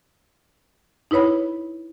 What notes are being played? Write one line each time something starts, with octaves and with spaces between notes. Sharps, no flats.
D#4 E4 B4 C#5 B5